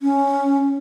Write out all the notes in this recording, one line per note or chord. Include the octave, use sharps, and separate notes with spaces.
C#4